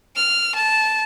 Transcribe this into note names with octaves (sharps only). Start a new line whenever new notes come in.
F6
A5